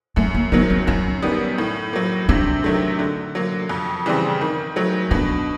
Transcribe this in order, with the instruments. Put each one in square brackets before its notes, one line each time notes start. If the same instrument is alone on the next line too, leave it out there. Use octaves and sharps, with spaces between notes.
[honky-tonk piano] F#2 [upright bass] A3
[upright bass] A#3
[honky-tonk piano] D#3 F#3 [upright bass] B3
[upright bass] C4
[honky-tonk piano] F#2 [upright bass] C#4
[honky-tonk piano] D#3 G3 B3
A2
F#3 A#3
[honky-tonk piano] C3 [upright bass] D4
[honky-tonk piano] D#3 F#3 A3
D3
F#3 A#3
F2
C#3 E3 G3 C4
D#3
F#3 A3
[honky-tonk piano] B2 [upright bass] D4